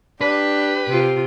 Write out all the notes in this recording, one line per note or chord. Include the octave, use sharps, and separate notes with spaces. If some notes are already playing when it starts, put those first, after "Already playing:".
D4 G4 B4
C3 F4